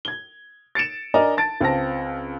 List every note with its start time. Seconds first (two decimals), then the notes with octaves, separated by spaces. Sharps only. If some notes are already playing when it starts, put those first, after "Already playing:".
0.05 G#6 G7
0.75 A6 C#7 D7 E7
1.14 D4 A#4 D5 D#5 G#5 A#5
1.37 A5 A6 D7
1.61 C#2 C4 F5 A5 A#6